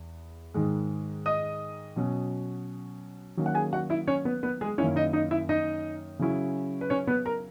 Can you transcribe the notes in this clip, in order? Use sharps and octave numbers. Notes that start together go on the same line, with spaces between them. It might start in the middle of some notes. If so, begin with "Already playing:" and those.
Already playing: E2
G#2 D#3 G#3
D#5 D#6
B2 F#3 C#4
D#3 F#3 A#3 C#4
F#5
G#4 G#5
F#4 F#5
E4 E5
C#4 C#5
B3 B4
B3 B4
G#3 G#4
F#2 D#3 A#3 C#4 E4 C#5
D#4 D#5
D#4 D#5
E4 E5
D#4 D#5
C#3 F#3 C#4 E4
B4
C#4 C#5
B3 B4
A#4 A#5